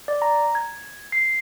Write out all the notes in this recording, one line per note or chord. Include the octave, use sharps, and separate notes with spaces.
D5
A#5
G#6
C7